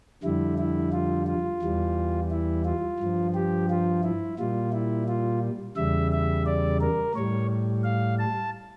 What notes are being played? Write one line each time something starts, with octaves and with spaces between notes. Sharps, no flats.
F2 D3 G3 E4
E4
F4
F4
E2 E3 G3
E4
F4
G2 F3
G4
F4
E4
A#2 G3 F4
E4
F4
E2 C#3 G3 E5
E5
D5
A#4
A2 G3 C#5
F5
A5